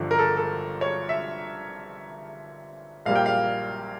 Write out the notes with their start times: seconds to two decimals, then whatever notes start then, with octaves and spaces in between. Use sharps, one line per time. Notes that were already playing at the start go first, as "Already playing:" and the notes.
Already playing: G1 G2 D3 F3
0.11 A#4
0.19 A4
0.37 A4
0.81 C#5
1.09 E5
3.06 A#1 A#2 G3 A#3 F5
3.16 G5
3.26 F5